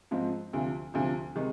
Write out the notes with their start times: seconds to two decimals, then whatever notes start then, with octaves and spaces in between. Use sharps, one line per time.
0.11 G#2 F3 C4
0.53 D2 C3 F3
0.94 D2 C3 F3
1.35 C3 D#3 G#3 D#4